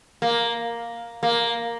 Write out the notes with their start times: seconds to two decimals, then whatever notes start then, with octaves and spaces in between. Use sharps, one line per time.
0.22 A#3
1.23 A#3